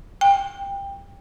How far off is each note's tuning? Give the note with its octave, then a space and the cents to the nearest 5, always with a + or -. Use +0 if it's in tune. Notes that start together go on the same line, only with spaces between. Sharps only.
G5 +20